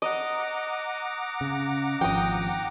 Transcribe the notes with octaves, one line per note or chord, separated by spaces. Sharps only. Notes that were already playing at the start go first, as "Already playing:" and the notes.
D#5 F#5 A#5 D6
C#3
G#1 F3 G5 D#6